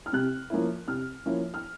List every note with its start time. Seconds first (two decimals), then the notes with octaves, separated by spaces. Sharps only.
0.06 F6
0.13 C3 F#6
0.50 F3 A#3 C#4 E4
0.88 C3 F6
1.26 F3 A#3 C#4 E4
1.54 F6